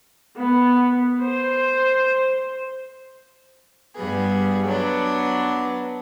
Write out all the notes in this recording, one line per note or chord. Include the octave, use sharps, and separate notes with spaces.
B3
C5
G2 G3 B3 G#4
F#3 B3 D4